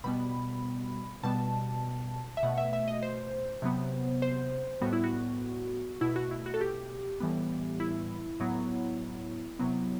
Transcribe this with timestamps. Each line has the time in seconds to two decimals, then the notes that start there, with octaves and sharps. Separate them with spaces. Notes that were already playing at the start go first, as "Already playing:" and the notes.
0.04 B2 G3 B3 B5
1.23 B2 G3 B3 A5
2.37 E5
2.43 B2 A3 F#5
2.58 E5
2.73 E5
2.88 D#5
3.03 C5
3.62 C3 F#3 B3
4.22 C5
4.81 A2 G3 B3 F#4
4.93 E4
5.04 F#4
6.01 B2 A3 E4
6.16 F#4
6.31 E4
6.46 F#4
6.54 A4
6.61 G4
7.20 A2 E3 G3 B3
7.80 E4
8.40 A2 F#3 B3
9.59 C3 F#3 B3